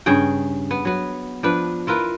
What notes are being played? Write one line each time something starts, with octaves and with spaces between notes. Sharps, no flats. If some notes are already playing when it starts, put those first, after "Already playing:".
G2 C#3 G#4 G5
B3
F#3 B3
F3 D4 B4
E4 F4 A#4 B4